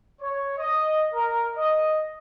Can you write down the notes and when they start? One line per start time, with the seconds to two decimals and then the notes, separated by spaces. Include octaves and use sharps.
0.22 C#5
0.57 D#5
1.14 A#4
1.56 D#5